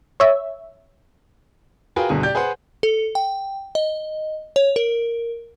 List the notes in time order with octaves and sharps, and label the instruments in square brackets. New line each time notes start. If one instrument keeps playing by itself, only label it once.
[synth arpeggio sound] C#5 E5
[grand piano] F4 F#4 G#4 A#4 B4 G5
G1 B2 D3 G#4
G4 D5 G6
G#4 B4 C5 F#5
[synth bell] A4
G5
D#5
C#5
A#4